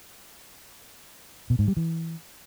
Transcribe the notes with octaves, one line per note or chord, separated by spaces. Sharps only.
B2
G#2
G3
E3